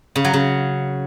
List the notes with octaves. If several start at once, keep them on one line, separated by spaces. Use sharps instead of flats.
C#3
F#3
C#3